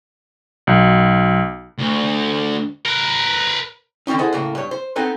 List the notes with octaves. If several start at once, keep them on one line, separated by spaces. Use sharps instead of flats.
B1
D2
A#4 B4
D3 D#3 C4 C#4 D#4
E4 G#4 A4 C5 D#5 F#5
A2 C#3 A#3
G2 C#5
C5
B3 C4 D#4 A4 B4